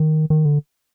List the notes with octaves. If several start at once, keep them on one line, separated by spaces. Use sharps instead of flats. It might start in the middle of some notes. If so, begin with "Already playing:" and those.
Already playing: D#3
D#3
D3